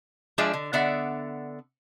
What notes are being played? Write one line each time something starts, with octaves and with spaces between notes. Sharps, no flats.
F3 G#3 D4 G#4 D5 E5
D3
D3 B3 D5 E5 F#5